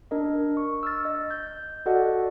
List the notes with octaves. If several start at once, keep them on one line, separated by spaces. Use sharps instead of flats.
D4 A#4 D#5
C#6
E6 F6 A6
D#5
G6
F#4 A4 D5 D#5 F#5